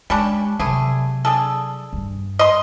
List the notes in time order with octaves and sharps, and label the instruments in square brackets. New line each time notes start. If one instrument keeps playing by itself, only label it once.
[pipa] G3 C#4 D4 [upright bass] G#3
[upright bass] C3 F#3 [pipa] G3 A3 G#4
[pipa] D4 G#4 A4
[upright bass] G2
[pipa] D#5 C6